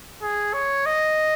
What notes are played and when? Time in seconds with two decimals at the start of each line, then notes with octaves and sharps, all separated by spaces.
0.22 G#4
0.54 C#5
0.86 D#5